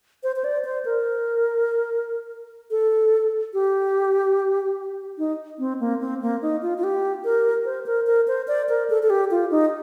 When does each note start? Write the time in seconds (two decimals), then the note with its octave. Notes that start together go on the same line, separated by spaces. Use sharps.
0.23 C5
0.36 C5
0.44 D5
0.64 C5
0.85 A#4
2.71 A4
3.54 G4
5.18 D#4
5.59 C4
5.80 A#3
6.00 C4
6.22 A#3
6.42 D#4
6.62 F4
6.78 F4
6.84 G4
7.24 A#4
7.65 C5
7.86 A#4
8.07 A#4
8.28 C5
8.48 D5
8.69 A#4
8.90 A4
9.03 A4
9.10 G4
9.31 F4
9.51 D#4